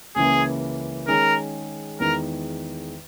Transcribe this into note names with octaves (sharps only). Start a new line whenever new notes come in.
C#2 C#3 E3 A#3 G#4
D#3 G#3 C#4 G#4 A#4
E2 D#3 G#3 A#4